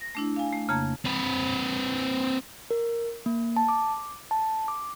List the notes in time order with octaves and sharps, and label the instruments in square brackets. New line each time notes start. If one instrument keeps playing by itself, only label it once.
[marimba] A#6
A3 D4 E4
F5 G#5
A3
F2 C#3 A#3 A5 A#5 G#6
[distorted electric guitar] C4 B4
[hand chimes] A#4
A#3
A5
D6
A5
D6